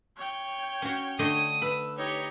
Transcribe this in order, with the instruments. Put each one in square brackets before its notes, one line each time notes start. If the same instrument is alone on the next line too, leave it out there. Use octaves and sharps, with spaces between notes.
[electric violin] C#5 G5
[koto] C#4 F#4
[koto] D3 A3 D#5 [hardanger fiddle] D#6
[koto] B4 [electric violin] E6
[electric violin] D#4 G4 [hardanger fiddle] C#5